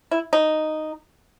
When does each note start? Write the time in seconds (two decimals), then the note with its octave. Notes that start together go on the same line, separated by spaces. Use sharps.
0.11 E4
0.33 D#4